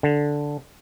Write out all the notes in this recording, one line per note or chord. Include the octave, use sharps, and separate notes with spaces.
D3